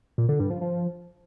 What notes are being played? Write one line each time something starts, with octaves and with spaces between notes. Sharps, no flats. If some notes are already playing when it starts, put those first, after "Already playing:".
A#2
D3
G2
F3
F3